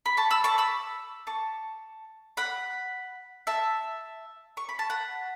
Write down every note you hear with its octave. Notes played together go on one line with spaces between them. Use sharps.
B5
A5 C#6
B5 E6
A5 C#6
B5 E6
A5 C#6
F#5 B5
E5 A5
C#6
B5
A5
F#5 B5